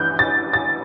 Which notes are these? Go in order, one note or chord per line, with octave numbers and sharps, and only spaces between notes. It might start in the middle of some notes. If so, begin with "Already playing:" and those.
Already playing: G2 E3 E4 F#6 G6
A6
A6